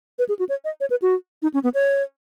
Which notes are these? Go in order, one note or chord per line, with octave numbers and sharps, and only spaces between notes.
B4
G#4
F#4
C#5
D#5
C#5
B4
F#4
D#4
C#4
B3
C#5